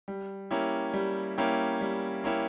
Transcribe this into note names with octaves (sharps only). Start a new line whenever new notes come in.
G3
A#3 C#4 E4 G4
G3
A#3 C#4 E4 G4
G3
A#3 C#4 E4 G4